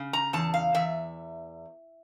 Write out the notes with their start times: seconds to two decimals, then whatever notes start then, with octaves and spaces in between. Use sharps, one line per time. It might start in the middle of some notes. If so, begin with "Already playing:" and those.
Already playing: C#3
0.13 A#5
0.33 E2 A5
0.54 F5
0.74 E2 E5